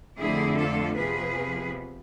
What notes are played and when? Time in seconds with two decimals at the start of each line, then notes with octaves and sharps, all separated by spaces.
0.18 F2 D3 A3 E4 G#4
0.58 F4 A4
0.96 F2 C3 F3 B3 G#4 B4